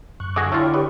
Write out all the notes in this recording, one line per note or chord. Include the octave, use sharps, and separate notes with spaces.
F#2 C#6 F#6
D3 F#4 G#4 A4 D#5 D6
A3 E4 F4 C#5 G5 C#6
G4 B4 D#5